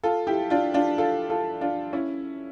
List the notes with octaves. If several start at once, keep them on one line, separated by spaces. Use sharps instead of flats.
F4 A4
E4 G4
D4 F4
D4 F4
F4 A4
F4 A4
D4 F4
C#4 E4